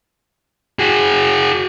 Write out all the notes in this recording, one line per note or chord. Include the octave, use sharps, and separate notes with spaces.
F#4 G#4